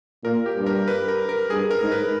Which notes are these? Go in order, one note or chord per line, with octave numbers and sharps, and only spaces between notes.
A#2 A#4
G4
G2
A#4
B4
A#4
A#4
G2 G#4
A#4
G#2
B4